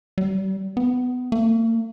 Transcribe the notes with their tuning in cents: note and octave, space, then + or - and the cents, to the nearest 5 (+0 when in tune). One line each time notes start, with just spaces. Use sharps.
G3 -35
B3 +20
A#3 -45